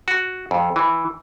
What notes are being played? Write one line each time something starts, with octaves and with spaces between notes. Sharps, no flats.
F#4
F2
E3